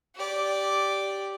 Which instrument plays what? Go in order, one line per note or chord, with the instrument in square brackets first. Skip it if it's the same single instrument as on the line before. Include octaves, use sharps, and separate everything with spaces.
[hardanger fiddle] G4 D5